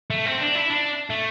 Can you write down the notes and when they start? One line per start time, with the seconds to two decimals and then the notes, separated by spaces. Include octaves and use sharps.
0.10 A3
0.26 C4
0.41 D4
0.55 E4
0.70 D4
1.10 A3